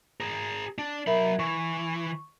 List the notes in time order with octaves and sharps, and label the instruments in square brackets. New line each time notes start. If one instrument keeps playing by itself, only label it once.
[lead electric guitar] G#4 A#4
D4
[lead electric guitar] F#3 B5 [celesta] A#4 E5
[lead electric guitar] E3 [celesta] C#6